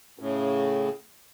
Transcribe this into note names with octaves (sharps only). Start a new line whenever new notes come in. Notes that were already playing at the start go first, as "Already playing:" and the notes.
A2 C#3